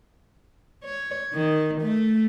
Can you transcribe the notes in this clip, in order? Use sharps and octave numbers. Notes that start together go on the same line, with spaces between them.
C#5
D#3
A3